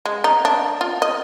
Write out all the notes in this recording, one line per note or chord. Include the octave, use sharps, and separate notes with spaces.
G#3
D#4
D4
F4
D#5